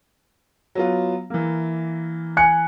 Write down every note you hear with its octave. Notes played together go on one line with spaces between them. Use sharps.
F#3 B3 F4
E3 A#3
G#5 F#6 C#7